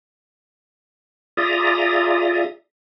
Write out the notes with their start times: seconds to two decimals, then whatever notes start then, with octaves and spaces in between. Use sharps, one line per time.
1.37 F4 G#4 D5 E5 A#5 D#6